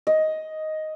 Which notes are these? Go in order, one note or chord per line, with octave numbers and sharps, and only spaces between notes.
D#5